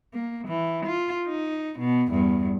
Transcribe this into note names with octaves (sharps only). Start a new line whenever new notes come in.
A#3
E3
F4
D#4
B2
E2 G2